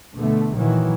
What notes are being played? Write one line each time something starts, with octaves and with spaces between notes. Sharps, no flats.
B2 D3 A3
A#2 D#3 E3 F#3